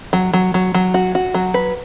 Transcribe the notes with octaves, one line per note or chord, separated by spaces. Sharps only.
F#3
F#3
F#3
F#3
F#4
F#4
F#3
B4